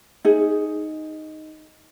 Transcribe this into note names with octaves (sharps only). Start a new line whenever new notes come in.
D#4 G#4